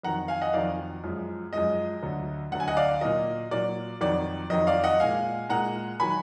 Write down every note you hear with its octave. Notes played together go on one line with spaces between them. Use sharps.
F2 D#3 F#3 F#5 A#5
F5 G#5
D#5 F#5
F2 D#3 F#3 D5 F5
F#2 F3 G#3
F#2 F3 G#3 D#5
D2 D3 F#3
D2 D3 F#3 F#5
G#5
D#5 F#5
D5 F5
A#2 F#3 D#5
A#2 F#3 D5
F2 D#3 F#3 D5
F2 D#3 F#3 D#5
D5 F5
D#5 F#5
A#2 G#3 F5 G#5
A#2 G#3 F#5 A#5
D#3 F#3 G#5 B5